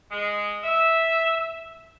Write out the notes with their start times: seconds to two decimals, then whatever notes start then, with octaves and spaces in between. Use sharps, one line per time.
0.11 G#3
0.64 E5